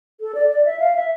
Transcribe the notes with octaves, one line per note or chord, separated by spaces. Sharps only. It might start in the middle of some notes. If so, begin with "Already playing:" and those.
A4
D5
D5
E5
F5
E5